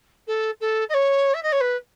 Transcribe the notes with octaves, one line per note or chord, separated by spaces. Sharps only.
A4
A4
D#5
C#5
E5
D#5
C#5
B4